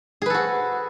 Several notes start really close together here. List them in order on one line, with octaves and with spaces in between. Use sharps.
G#4 B4 A4 F#4